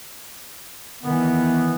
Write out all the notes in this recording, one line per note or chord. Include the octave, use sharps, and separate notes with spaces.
D#3 E3 B3